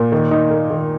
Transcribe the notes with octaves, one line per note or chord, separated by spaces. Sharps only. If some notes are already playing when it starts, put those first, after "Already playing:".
Already playing: A#2
D#3
D#4
A#3
D#3